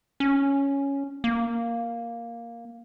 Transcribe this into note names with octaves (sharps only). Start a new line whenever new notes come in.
C#4
A#3